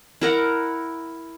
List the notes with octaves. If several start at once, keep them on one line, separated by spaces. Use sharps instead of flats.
E4 A#4 F#5